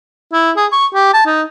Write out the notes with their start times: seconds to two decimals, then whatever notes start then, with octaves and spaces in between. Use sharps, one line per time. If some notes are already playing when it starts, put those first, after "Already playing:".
0.33 E4
0.57 G#4
0.72 C#6
0.94 G4
1.14 A5
1.26 D#4